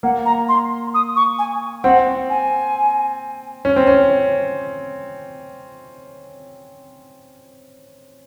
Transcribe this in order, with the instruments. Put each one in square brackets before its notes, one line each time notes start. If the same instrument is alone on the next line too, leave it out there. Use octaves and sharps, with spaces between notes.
[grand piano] A#3 [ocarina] F#5
[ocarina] A#5
C6
D#6
C#6
G#5
[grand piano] C4 [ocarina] F#5
[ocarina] G#5
[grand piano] C#4
C4
C#4